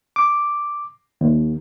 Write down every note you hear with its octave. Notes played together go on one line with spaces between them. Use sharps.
D6
D#2